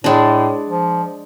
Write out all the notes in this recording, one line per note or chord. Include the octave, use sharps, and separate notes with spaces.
A2 G#3 D4
F3